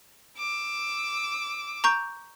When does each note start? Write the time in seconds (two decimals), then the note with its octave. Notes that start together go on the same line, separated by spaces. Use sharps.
0.37 D6 E6
1.84 A#5 C#6 G6